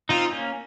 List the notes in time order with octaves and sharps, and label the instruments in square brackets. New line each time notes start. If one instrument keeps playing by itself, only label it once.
[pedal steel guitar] C4 D#4 [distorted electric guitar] F4
[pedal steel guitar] A#3 C#4